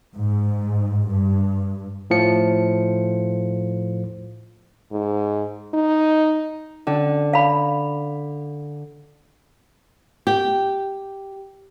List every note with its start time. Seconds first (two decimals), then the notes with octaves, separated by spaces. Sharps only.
0.16 G#2
1.07 G2
2.10 A2 F3 C#7
4.93 G#2
5.74 D#4
6.87 D3 C#4
7.33 F5 B5
10.27 G4